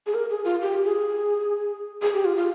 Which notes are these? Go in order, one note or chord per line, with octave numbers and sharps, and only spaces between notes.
G#4
A#4
G#4
F4
G4
G#4
G#4
G4
F4
F4